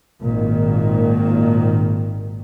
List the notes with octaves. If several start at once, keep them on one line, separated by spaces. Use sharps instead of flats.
G#1 A#2 D#3